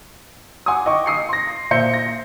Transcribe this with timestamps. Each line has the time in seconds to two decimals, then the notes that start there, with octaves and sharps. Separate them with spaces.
0.66 F#5 G#5 C6 D6 D#6
0.86 D#5 G5 C#6 D6
1.06 D#6 C7 C#7
1.29 C6 A#6
1.71 A#2 C5 E5 C6 G6 C#7
1.94 A#6